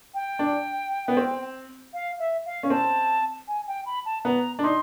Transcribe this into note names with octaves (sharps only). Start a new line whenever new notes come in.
G5
D4
B3
C4
F5
E5
F5
C#4
C4 A5
G#5
G5
B5
A5
B3 A#5
D4
D#4 C6